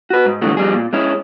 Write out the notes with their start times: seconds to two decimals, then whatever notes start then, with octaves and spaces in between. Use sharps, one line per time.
0.10 F#4 B4
0.26 G#2
0.42 G2 A#2 D3 E3 G#3 A3
0.57 F2 G3 G#4
0.74 A#2
0.93 G#3 C#4 E4